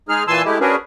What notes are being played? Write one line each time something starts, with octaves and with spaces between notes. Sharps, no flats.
G#3 D#4 G#4 F6
A#2 E3 G#5 A5 C6 E6
G#3 A3 E4 G4
C#4 D4 F#4 G#4 A#4 B4